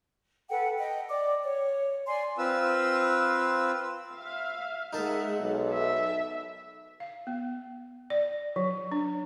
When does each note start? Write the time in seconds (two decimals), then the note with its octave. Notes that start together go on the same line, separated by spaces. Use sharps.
0.50 A4 B4 F#5 G5
0.78 D#5 G5
1.09 D5 D6
1.42 C#5
2.06 D5 G#5 C6
2.38 C4 F4 B4 E6
4.15 E5 F5
4.93 G#3 D#4 A#4 E5 F#5 A5
5.40 B1 A4
5.73 E5
7.00 F5
7.27 B3
8.10 D5
8.56 F#3
8.92 D4